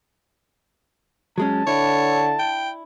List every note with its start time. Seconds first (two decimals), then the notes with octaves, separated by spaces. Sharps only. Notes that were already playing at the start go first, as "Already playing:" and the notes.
1.38 F#3 G#3 C#4 A5
1.67 D3 D4 E4 C#5
2.39 G5